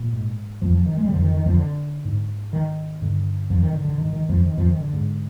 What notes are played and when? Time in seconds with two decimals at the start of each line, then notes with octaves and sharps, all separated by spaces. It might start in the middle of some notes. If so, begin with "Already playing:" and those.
Already playing: A#2 A#3
0.13 G#2
0.62 F2 F3
0.75 F3
0.86 D#3
0.97 G#3
1.05 G3
1.09 F2 D3 F3
1.21 D#3
1.34 D#3
1.46 F2 F3
1.57 D3
2.05 G#2
2.53 D#3
3.01 G2 D3
3.50 F2 F3
3.62 D#3
3.73 D3
3.85 D3
3.97 G#2 D#3
4.13 D#3
4.29 F2 F3
4.46 D#3
4.57 F2 F3
4.69 D#3
4.81 D3
4.93 G#2